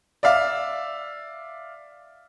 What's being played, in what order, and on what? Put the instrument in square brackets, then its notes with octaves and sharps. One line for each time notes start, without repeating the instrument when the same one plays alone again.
[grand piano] D5 E5 F5